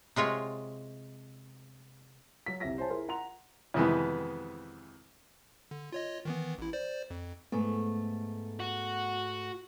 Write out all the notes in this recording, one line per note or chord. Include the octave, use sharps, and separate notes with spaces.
C3 G#3 F4 C#5
F#3 B6
C2 C3 G4 E5 A#6 B6
C5 C#5 G#5 A5
E4 G#4 A#4 C6
F#5 A#5 C6 F7
F2 C3 D#3 E3 G#3 B3
D3
F4 C#5 D#5
D#3 E3 B3
A1 E4
C5 D5
F2
G#2 A3 B3
F#4